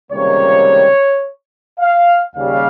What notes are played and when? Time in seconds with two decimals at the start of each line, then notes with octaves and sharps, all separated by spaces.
0.11 C#2 C3 D#3 G3 A#3 C#5
1.80 F5
2.35 D#2 C#3 G3 F5